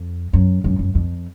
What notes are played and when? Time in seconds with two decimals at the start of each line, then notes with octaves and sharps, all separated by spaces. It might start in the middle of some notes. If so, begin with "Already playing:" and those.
Already playing: F2
0.33 F#2
0.64 F#2
0.79 F#2
0.95 F2